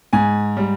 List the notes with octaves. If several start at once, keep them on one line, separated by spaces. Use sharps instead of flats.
G#2 G#5
G3